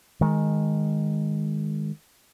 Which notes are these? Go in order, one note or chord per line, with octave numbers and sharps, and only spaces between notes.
D#3 G#3